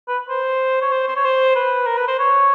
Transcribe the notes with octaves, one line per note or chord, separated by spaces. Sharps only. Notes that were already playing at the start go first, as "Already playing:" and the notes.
B4
C5
C#5
C5
C5
C#5
C5
B4
A#4
B4
C5
C#5